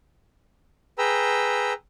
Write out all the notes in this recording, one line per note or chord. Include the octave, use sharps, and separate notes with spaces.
G#4 B4 G5 A#5 E6